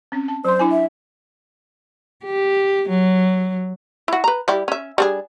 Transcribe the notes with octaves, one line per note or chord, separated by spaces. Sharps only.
C4 C#4
A5
F#3 C5 C6
D4 E4 G#5
E5
G4
F#3
E4 F#4
B4 A#5
G3 E4 G4
C#4 E5
G3 D4 G#4